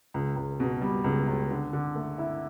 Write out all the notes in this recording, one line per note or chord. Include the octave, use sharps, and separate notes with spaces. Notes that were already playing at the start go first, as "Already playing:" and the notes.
C#2
C#2
B2
G3
C#2
C#2
D3
D3
A3
E4